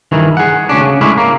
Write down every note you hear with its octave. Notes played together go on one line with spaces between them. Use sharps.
G2 D#3 E3
G#4 F#5
D2 C#4 D4
C#3
A2 G#3 C#4 D4 E4
A#3